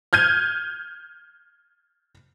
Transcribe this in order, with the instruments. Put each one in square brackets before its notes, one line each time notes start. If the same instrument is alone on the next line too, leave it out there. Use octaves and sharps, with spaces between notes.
[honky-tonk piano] F6 G6 G#6 D#7